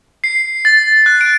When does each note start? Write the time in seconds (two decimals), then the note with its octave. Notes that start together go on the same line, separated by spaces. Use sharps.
0.24 C7
0.65 A6
1.06 F#6
1.21 D7